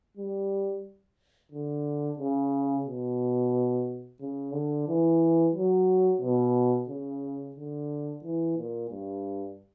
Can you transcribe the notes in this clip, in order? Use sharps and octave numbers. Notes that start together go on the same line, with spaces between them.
G3
D3
C#3
B2
C#3
D3
E3
F#3
B2
C#3
D3
E3
A#2
G2